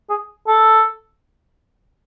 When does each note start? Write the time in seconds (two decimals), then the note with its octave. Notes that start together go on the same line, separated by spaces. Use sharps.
0.10 G#4
0.48 A4